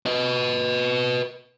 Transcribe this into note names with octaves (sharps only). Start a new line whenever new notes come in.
B4 D#5